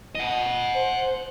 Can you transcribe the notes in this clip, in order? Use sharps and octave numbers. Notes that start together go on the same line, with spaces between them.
D#5 F#5
C5